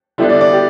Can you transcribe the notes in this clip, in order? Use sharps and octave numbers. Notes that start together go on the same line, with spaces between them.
D3 G3 B3 D4 E4
D5
D5
G4